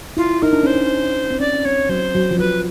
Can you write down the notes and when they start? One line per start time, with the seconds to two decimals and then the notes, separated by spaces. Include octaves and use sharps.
0.17 E4 F4
0.42 D#4 A#4
0.53 D4
0.63 C#4 C5
0.74 D4
1.31 C4
1.40 C#4 D5
1.55 C#4
1.65 C4 C#5
1.89 F#3 C5
2.15 F#3
2.31 F3
2.39 F#3 B4